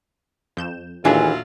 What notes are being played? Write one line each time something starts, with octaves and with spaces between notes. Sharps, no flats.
F2 G6 E7
D#2 A#2 E3 F#3 A3 D4 F4 G#4